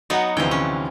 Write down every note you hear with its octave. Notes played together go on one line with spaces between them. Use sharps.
F#3 B3 D#4 F#4 D#5 F#5
D2 C3 E3 F3 G5
C#4